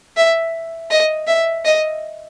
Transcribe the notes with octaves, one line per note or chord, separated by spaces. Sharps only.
E5
D#5
E5
D#5